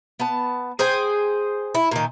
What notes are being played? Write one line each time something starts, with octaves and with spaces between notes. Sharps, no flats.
B3 A5
G#4 C5 G5 G#5
E4
A#2 D#3